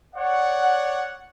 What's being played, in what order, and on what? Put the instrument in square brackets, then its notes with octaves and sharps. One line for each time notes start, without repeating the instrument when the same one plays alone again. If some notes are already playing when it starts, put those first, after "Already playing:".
[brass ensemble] C#5 D5 F#5